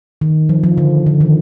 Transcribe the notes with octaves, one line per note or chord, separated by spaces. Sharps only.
D#3
F3
F3
D3
D3
D#3